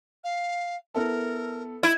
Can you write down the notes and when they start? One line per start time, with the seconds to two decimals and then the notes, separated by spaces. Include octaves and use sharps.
0.24 F5
0.95 B3 E4 A4 A#4
1.83 E4 G#6 D#7